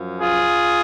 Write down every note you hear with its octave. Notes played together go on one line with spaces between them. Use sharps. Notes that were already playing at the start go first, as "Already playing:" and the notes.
Already playing: F#2 F3
F4 G#4